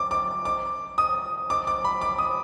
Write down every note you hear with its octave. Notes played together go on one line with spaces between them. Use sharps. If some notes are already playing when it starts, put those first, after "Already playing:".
Already playing: D6
D6
D6
D#6
D6
D6
B5
D6
D#6